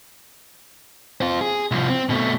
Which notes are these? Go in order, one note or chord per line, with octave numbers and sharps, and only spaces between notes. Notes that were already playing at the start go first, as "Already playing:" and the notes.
C4 F4
G#4
C2 F3
C4
B2 A3